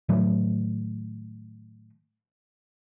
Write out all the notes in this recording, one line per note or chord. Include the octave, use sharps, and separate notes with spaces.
A2 D#3 F#3 A3